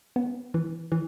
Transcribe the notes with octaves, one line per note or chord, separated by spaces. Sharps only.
B3
E3
E3